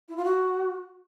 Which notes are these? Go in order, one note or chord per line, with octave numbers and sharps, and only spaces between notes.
E4
F4
F#4